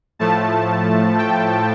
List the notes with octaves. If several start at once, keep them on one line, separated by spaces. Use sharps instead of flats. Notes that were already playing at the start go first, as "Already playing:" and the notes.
A2 F3 A3 A5
G5